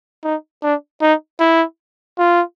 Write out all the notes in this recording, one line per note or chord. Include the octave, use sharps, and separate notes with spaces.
D#4
D4
D#4
E4
F4